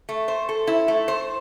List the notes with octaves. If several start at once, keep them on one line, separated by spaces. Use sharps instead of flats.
A3
C5
A4
E4
A3
C5